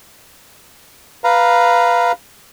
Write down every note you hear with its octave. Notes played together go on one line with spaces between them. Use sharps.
B4 F5 A#5